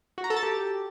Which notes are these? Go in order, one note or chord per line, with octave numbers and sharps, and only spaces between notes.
F#4
A#5
A4
A5
G4